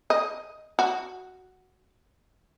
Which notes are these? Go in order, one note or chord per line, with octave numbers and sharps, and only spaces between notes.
D#5
F#4